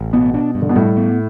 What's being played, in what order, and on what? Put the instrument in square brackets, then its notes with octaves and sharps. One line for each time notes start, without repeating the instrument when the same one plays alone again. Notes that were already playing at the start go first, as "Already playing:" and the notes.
Already playing: [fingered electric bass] A1
[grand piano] B2 [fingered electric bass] B3
[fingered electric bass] D4
G2
[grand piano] D3
B2
[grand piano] A2 [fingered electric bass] G3
[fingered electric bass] B3